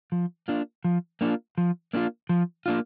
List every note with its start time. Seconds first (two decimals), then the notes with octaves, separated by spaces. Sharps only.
0.12 F3
0.48 A#3 D4 F4
0.84 F3
1.21 A#3 D4 F4
1.58 F3
1.93 A#3 D4 F4
2.29 F3
2.66 A#3 D4 F4